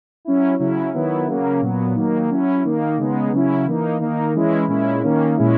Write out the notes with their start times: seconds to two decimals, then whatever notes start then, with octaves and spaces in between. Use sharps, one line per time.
0.25 F#3 C#4 E4
0.59 C#3 F#3 C#4 E4
0.94 D#3 F#3 B3 E4
1.27 C#3 F#3 A#3 C#4
1.61 A#2 F#3 B3
1.95 D#3 F#3 A#3 D#4
2.30 F#3 C#4 E4
2.64 D#3 A#3 D#4
2.98 C#3 G#3 B3 D#4
3.32 C#3 F#3 C#4 E4
3.66 E3 A#3 D#4
4.00 D#3 A#3 D#4
4.34 E3 G#3 C#4 E4
4.68 A#2 G#3 C#4 E4
5.03 D#3 A#3 C#4
5.37 A#2 G#3 C#4 E4